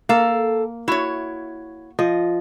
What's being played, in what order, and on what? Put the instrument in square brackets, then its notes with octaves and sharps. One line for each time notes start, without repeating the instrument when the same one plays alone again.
[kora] A#3 [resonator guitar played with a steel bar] A4 F5
[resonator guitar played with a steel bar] E4 C#5 [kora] F#4
[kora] F3 D#5